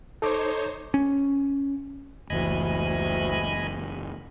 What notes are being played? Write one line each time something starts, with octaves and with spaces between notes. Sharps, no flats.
D#4 A4 C5 C#5 D6
C#4
F#1 D2 E3 D#5 G#5 B5